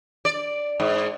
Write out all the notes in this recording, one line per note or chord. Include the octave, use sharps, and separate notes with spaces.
D5
G#2